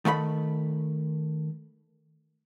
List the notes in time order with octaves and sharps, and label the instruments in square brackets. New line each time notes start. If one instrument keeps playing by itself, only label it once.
[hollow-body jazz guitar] D#3 A3 E5 B5